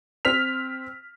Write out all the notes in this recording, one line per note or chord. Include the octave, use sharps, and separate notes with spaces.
C4 F6 B6 F7